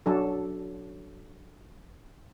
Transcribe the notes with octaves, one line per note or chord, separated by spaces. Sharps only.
F#3 D4 A4